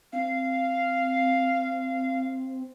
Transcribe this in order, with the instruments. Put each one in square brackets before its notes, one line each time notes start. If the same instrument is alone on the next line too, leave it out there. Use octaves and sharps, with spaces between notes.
[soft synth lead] C4 [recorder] F5